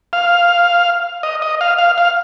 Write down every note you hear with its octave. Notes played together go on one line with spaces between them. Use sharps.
F5
D#5
D#5
F5
F5
F5